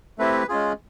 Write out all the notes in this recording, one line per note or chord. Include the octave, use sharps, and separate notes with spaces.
A3 C4 E4 G4 B4
G#3 C#4 F4 G#4